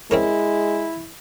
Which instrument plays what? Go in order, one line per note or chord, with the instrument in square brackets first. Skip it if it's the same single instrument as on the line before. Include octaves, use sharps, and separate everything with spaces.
[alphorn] G#3 [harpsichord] C4 C#4 A#4 [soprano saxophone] E4